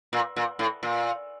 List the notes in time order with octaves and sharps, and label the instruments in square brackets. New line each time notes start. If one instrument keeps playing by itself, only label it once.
[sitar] A#2
A#2
A2
A#2